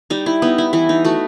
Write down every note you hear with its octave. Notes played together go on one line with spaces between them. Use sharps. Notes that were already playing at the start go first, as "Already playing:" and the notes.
G3 D#4
E4
B3 D#4
E4
E3 E4
D#4
A3 F#4